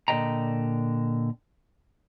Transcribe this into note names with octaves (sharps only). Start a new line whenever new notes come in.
A#2 D3 C5 D#5 G5 A#5